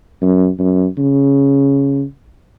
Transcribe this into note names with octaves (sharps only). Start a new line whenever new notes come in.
F#2
F#2
C#3